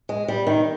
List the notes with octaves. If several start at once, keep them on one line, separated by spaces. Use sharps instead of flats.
G#3
G3
D#3